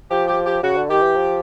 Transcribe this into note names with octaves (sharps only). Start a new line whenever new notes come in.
F3 G4
G4
G4
C#3 F#4
D3
D#3 G4
E3
F3